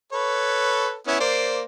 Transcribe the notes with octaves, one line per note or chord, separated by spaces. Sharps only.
A4 B4 C#5
B3 C#4 E4
A#3 C5 D5